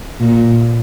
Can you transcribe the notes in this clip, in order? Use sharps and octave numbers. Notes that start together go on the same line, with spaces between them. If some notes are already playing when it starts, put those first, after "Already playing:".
A#2